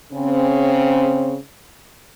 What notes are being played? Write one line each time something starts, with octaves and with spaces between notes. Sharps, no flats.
C#3 C4 C#4